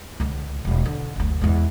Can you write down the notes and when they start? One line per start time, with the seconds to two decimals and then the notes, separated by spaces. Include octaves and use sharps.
0.20 C#2 D3
0.65 E1 G#3
0.86 D3
1.16 F#1 D2
1.41 E2 G#3